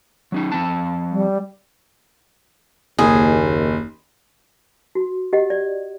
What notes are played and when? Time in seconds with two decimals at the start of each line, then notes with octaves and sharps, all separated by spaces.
0.32 F#3 C#4 D#4
0.52 F3 C4 A5
1.11 G3
2.99 F#1 D#2 G#4
4.95 F#4
5.33 G4 D#5 F#5
5.50 D5